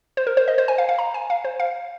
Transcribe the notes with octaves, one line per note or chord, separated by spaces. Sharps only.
C5
A#4
C5
D#5
C5
G#5
F5
F5
A#5
G#5
F5
C5
F5